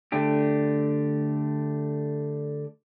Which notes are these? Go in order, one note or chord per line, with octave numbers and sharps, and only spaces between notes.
D3 A3 D4 G4